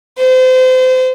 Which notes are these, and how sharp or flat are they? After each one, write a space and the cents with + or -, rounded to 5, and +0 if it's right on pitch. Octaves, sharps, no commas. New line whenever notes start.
C5 -30